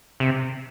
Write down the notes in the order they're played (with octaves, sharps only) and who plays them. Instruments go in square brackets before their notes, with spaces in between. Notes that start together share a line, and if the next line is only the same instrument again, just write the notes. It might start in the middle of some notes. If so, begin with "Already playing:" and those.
[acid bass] C3